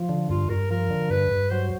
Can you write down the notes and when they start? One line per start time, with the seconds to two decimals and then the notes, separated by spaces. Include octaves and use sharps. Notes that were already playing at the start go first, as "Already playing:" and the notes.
Already playing: F3
0.09 D3
0.30 G2 F4
0.49 G2 A#4
0.71 F3 A#4
0.90 D3
1.10 G2 B4
1.31 G2
1.50 F#3 C5